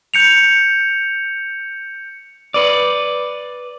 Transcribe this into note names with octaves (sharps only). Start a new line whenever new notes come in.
G6 C#7 F7
B4 D5